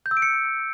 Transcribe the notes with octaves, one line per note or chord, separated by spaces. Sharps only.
G6
E6
D7
C#7